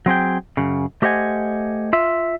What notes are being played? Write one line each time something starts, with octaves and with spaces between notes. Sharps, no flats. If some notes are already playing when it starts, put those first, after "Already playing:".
F#3 C4 G#4 G5
F#2 C#3
A3 G4 C5 D#5 F#5 G#5
F4 E5